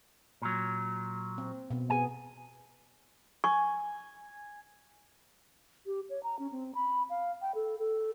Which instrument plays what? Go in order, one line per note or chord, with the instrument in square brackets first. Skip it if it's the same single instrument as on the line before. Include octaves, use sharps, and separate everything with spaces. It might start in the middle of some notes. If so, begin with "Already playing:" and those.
[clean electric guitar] A#2 F#3
[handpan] C4
B2
[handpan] B3 G#4 [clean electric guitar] G#5
[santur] G#5 [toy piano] C#6
[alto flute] G4
C#5
A#5
C#4
C4
B5
F5
G5
A4
A4